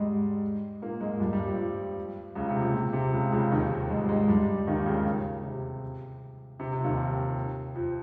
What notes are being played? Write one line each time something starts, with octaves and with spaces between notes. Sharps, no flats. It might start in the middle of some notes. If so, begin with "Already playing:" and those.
Already playing: G#2 G3 G#3
A#2 A#3
G#2 G#3
F3
G2 G3
G2 G3
F2 F3
F2 F3
C#2 C#3
C3
A#2
A#2
C3
C#2 C#3
C#2 C#3
D#2 D#3
F2 F3
G#2 G#3
G3
G#2 G#3
G2 G3
D#2 D#3
C#2 C#3
C3
C3
C3
F3
D#2 D#3
F2 F3